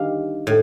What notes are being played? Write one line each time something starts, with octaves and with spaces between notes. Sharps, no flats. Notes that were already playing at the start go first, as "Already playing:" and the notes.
Already playing: D#3 G3 D4 F5
A2